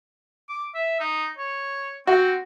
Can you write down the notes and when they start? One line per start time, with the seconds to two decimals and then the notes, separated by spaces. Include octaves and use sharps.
0.49 D6
0.75 E5
1.00 D#4
1.38 C#5
2.07 C4 F#4